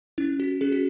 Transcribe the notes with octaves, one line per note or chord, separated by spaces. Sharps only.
C#4 E4
F#4
C#4 G#4
F#4